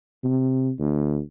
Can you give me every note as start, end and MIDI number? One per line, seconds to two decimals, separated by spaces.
0.24 0.71 48
0.79 1.19 38